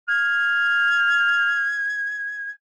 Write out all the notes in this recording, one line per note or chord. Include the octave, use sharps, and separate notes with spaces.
F6 G#6